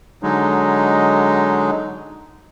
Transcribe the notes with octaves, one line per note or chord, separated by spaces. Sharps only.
D3 F#3 G#3 D#4